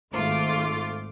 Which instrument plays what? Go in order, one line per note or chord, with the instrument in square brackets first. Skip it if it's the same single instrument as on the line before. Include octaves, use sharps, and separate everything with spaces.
[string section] G#1 A3 F4 D6